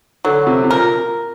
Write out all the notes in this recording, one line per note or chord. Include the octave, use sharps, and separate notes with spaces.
D3 F#3
C3
C3
A#2 A#4